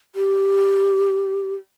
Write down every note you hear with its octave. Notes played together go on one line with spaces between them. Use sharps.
G4